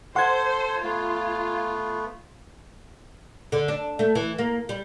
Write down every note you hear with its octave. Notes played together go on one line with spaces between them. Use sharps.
A4 C5 F#5 C6 G#6
A3 B3 F4
D3
D4
A3
E3
A#3
G3